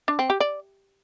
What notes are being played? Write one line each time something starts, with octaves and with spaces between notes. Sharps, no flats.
D4
C4
G4
D5